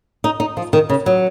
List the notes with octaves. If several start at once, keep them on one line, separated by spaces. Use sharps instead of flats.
D#4
D#4
F3
D#3
C#3
F#3